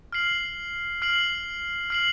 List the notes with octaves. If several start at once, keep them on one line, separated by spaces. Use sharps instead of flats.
F6 C7 F#7
F6 C7 F#7
F6 C7 F#7